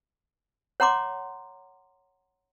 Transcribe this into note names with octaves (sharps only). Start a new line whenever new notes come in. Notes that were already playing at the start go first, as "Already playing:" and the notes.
C#5 F#5 A#5 C6 D6